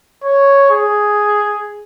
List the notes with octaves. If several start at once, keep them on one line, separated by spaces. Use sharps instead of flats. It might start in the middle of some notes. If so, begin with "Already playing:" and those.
C#5
G#4